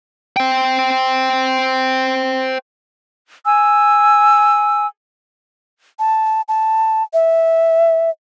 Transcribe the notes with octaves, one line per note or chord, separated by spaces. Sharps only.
C5 G5
G#5 E6
A5
A5
E5